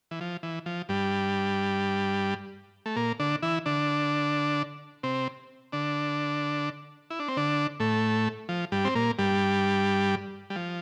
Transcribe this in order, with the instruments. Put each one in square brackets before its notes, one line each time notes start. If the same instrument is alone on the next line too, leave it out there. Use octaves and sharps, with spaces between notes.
[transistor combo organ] E3
F3
E3
F3
G2 G3
A3
A#2 A#3
D3 D4
E3 E4
D3 D4
C3 C4
D3 D4
E4
D4
C4
D3 D4
A2 A3
F3
G2 G3
C4
A#2 A#3
G2 G3
G3
F3